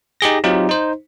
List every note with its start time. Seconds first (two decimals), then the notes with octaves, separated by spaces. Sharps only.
0.21 D#4 G4 G#4 A#6
0.44 F#3 C4 D#4 F4 G4
0.69 D#4 C5